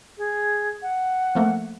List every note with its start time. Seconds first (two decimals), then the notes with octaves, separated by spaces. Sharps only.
0.18 G#4
0.82 F#5
1.35 F3 A3 A#3